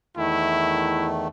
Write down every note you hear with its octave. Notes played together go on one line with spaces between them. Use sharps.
E2 D#3 A3 E4